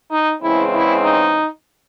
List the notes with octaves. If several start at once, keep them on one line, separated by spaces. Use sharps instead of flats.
D#4
E2 C#3 G#3 C4 E4
E4
D#4